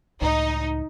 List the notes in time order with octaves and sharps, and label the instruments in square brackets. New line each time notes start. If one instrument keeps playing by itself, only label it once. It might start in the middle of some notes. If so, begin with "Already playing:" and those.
[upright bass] C#2 A2 [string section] D#4